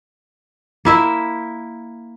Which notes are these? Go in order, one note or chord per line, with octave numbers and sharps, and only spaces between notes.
A#3 E4 E5